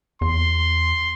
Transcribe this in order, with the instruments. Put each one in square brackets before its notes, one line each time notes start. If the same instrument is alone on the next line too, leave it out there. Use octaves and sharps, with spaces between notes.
[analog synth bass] E2 [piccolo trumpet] C6